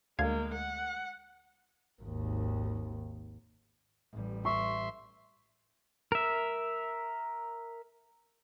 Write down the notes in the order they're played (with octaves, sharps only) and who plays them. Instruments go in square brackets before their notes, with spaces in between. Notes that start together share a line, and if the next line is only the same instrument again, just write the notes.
[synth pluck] D2 F5 G#6 [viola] G#3 A#3
[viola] F#5
[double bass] G#1 D#2
A1 G3
[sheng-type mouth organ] E5 C6 [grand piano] C#6
[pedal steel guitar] A#4 E5